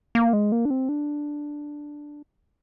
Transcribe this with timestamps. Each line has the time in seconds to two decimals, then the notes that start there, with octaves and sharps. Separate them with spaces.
0.15 A#3
0.33 G#3
0.52 A#3
0.65 D4
0.70 C4
0.89 D4